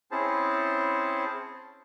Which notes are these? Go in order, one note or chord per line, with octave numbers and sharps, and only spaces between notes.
C4 C#4 E4 G#4 C5 A5